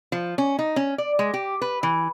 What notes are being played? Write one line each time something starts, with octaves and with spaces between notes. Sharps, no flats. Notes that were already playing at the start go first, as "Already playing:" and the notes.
F3
C#4
D#4
C#4
D5
G#3
G4
B4
E3